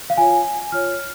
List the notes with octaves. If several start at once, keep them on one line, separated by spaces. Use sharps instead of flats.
F5
F4 C#5 G#5
F4 C#5 F6